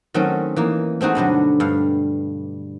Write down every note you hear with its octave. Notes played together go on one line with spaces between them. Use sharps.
D#3 F#3 A3 C4 C#4
E3 A#3 D#4
A3 C4 D#4 F#4 G#4
G2 B2 D3 F#3
G2 F5